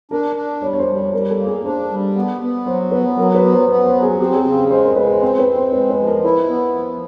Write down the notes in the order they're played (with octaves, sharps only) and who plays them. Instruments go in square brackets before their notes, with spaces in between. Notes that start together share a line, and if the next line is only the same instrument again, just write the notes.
[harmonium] D4 [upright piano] A#4
[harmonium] D4
[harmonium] G3 [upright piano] C#5
[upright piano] C#5
C5
[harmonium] G3
[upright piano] C5
[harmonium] G3 [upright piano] A#4
[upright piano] A4
[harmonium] A#3
[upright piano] G#4
[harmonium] D4 [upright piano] C5
[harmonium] G3
B3
B3
[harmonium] F#3 [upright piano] C5
[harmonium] B3 [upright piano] B4
[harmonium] F#3 [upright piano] A#4
[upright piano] B4
[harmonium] B3
[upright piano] C5
[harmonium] B3 [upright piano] C#5
[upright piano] C5
[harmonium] F#3
[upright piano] G#4
[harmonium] C4 [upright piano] G4
[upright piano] G#4
[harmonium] C#3 [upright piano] G#4
[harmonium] G#3 [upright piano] C5
[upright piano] A#4
[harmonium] G#3 [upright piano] B4
[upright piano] C5
[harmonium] C4 [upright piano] C5
[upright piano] B4
[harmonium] C4
[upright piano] C5
[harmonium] G#3 [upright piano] B4
[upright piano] B4
[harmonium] F3
[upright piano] A#4
[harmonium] E4 [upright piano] B4
[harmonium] B3
F3